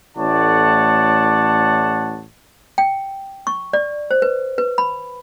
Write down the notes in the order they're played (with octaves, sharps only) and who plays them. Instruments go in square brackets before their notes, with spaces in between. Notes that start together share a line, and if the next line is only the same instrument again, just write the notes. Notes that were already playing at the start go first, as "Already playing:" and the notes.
[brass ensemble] A1 A2 C#5 D5 F#5 A5
[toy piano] G5
C#6
D5
C5
B4
B4
B5